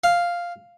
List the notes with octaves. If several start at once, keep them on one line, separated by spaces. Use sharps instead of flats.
F5